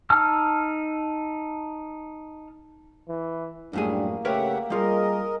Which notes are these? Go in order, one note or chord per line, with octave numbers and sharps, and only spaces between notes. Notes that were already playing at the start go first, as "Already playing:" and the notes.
D#4 A5 E6 F6
E3
F#2 A2 G3 A#3 D4 G#4
C#3 A3 G4 A#4 B4 C#5 E5 F#5
G3 F4 G#4 A#4 D#5